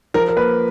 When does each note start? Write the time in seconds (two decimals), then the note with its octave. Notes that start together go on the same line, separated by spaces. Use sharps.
0.14 F3 A#4
0.28 A#4
0.37 A#3 B4